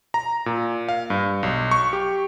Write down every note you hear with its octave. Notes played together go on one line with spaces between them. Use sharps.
A#5
A#2
F5
G2
B1
C#6
G4